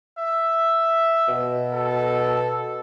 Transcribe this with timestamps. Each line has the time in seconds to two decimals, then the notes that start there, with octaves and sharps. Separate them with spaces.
0.18 E5
1.28 B2
1.73 A4